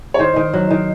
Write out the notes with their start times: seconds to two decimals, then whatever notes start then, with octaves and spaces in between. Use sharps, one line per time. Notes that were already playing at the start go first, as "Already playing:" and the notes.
0.14 C#5
0.19 D#3 C5
0.36 D#3
0.54 F#3
0.70 D#3